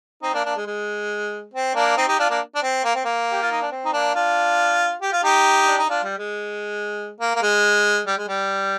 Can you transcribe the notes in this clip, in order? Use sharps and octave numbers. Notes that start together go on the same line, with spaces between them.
C4 D#4
A#3 D4
A#3 D4
G#3
G#3
C4
A#3 D4
C4 D#4
D#4 G4
D4 F4
A#3 D4
D4
C4
A#3
C4
A#3
G4
F4
D#4
D4
C4
D#4
A#3 D4
D4 F4
G4
F4
D#4 G4
D4
D#4
D4 F4
G3
G#3
A#3
A#3
G#3
G3
G#3
G3